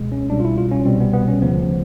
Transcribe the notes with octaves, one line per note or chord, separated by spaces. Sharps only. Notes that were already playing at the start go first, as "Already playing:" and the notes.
Already playing: C#2 B2 G#3
C#4
C2 B2 G3 D4
F4
E4
F4
C#4
C2 B2 G3 C4
B3
B3
C#4
D2 C#3 F3 B3